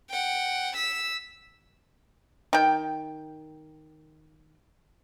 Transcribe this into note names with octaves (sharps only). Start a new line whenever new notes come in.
F#5 G5
E6 B6
D#3 G5